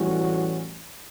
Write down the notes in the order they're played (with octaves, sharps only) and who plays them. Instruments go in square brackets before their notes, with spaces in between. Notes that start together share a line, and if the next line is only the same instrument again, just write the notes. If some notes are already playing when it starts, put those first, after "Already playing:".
Already playing: [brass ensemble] A2 E3 G3 C#4 F#4